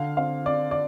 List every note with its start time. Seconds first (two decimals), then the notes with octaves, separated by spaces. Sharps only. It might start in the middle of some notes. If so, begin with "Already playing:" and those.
Already playing: D3 F5
0.17 C4 F5
0.46 C4 D5
0.71 D5